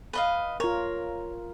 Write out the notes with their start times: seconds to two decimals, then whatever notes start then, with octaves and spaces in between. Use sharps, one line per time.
0.13 B4 D#5 F5
0.60 F4 A#4 C#5